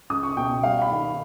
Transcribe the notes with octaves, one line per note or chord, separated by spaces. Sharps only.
C#2 D#6
C#6
B2 G5
G3 F5
B5
D#3